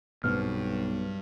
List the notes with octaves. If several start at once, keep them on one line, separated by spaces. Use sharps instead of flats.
B1 G2 B2 C4 F6